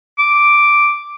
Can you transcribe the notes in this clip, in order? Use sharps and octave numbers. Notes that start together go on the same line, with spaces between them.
D6